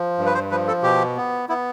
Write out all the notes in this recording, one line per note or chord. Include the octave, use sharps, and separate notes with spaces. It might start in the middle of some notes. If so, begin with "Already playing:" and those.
Already playing: F3
G2
B4
C5
F3 B4
A4
B2 G4
B3
B3 E4